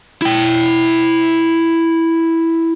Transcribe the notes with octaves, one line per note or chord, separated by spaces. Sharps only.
E4 G5